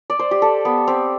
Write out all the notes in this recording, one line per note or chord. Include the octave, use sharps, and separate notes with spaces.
D5
C5
G4
A4
B3
C4